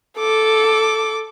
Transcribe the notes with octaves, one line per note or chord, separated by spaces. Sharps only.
A4 D6